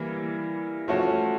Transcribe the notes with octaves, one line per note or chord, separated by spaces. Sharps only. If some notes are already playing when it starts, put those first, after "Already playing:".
Already playing: E3 G3 A#3
F3 A3 C#4 F#4